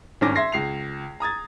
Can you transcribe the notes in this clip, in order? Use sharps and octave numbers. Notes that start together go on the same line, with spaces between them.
G#1 G2 C#4 D6 A#6
E5 C6 G#6 A#6 C7
C#2 C7 F7
A#5 D#6 G#6 A6